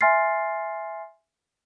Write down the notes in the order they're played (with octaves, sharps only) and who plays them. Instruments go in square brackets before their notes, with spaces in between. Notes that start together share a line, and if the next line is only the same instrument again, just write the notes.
[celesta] E5 G#5 C6 F6 A6 C7